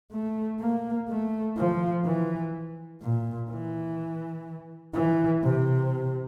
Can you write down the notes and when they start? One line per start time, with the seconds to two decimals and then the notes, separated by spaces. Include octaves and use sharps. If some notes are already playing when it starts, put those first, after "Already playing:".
0.12 A3
0.60 A#3
1.09 A3
1.56 F3
2.05 E3
3.02 A#2
3.50 E3
4.94 E3
5.42 C3